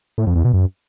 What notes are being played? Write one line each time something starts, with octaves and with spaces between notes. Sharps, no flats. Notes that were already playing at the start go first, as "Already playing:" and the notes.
A2
F2
E2
B2
F#2